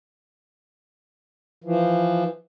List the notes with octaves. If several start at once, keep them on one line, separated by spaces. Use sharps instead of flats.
E3 F3